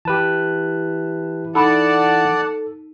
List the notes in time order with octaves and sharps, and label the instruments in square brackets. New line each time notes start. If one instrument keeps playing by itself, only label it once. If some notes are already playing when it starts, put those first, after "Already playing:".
[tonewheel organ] E3 [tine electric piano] G4 B4 A5
[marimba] D#4 B5 [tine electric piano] A4 [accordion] D5 F#5 A5